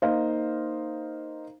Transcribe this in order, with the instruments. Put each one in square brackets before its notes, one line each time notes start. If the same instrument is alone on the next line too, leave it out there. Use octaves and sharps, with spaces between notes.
[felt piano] A#3 D#4 C5 D#5 F5